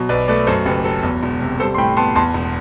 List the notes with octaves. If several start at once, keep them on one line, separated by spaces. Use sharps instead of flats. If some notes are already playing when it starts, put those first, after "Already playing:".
Already playing: B2 F#3
B1 B4 D5
A3 B4 D5
F#2 A4 C5
F#1 G4 B4
F#3 A4
E2
E1
C3
G3 A4 C5
C6
A2 G5 B5
B3 A5 C6
E2 A5 C6
E1